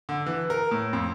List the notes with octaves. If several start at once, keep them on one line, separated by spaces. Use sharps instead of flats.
D3
E3
A#4
A2
F2